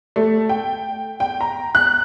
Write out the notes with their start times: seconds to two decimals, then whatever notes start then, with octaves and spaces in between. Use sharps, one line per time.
0.16 A3
0.49 G5
1.20 G5
1.41 A#5
1.75 F#6